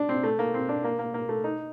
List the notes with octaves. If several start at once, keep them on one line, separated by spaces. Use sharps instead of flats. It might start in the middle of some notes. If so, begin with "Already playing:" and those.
Already playing: D4
C4
A3
A#3
C4
D4
A#3
A#3
A#3
A3
D#4